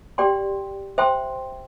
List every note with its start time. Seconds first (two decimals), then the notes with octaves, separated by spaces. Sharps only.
0.18 G4 D5 G5 C6
0.98 C5 E5 G5 C6